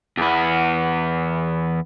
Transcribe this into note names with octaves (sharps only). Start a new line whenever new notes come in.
E2 B3